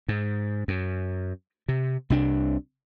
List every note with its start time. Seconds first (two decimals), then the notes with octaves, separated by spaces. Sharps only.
0.08 G#2
0.68 F#2
1.68 C3
2.10 C2 C3 D4